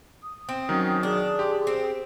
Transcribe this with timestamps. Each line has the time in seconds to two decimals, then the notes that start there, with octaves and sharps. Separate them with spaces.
0.23 D#6
0.49 C4
0.69 D#3 F#3 C#4
1.03 D4 G#4
1.39 G4 C6
1.67 C4 C5